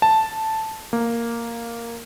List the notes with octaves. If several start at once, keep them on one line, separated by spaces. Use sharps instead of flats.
A5
A#3